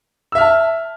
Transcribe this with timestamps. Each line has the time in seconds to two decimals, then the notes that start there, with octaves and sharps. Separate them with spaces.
0.32 E6
0.35 E5
0.38 F6
0.41 A5